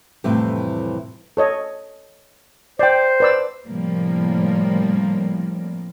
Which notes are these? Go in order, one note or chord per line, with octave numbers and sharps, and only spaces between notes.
F2 A2 C3 E3 G3
A4 C#5 D#5
C5 D5 G5
B4 D5 E6
A2 C3 F3 G3 A#3